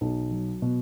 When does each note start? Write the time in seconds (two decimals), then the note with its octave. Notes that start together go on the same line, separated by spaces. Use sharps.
0.01 B1
0.31 F#3
0.62 B2